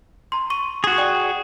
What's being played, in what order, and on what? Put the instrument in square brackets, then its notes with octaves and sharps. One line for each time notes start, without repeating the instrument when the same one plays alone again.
[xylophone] A#5 C6
C#6 D#7
[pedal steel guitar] F#4 G#4
[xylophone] D5 G5